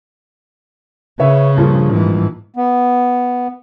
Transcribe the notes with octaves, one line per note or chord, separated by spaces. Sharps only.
C#3 B4 C#5 E5
G2 A#2 F3
G#2 E3
B3